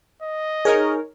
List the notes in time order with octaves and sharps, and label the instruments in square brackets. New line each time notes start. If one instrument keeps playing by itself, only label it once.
[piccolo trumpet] D#5
[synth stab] D#4 A#4 C#5 [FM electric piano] G#4